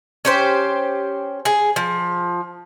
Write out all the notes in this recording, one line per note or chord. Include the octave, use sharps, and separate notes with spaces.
C#4 G4 C5
G#4
F3